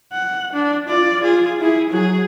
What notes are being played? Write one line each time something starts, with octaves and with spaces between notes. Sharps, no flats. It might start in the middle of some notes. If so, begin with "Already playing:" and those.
F#5
D4
F4 D5
F4 G#4
E4 G#4
F#3 G#4